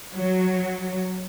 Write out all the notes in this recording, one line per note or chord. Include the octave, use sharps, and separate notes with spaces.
F#3